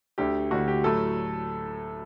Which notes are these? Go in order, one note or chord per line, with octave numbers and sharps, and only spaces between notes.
D2 D3 A3 G4
D2 D3 A3 F#4
G4
A2 F#3 A3 A4